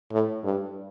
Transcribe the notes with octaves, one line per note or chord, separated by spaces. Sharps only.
A2
G2